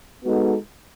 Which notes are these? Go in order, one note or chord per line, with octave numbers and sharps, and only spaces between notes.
G#3 B3 D#4 F#4 A4